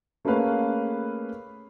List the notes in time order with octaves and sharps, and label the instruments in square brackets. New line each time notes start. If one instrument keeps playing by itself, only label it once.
[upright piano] A3 A#3 C#4 G#4 B4 F5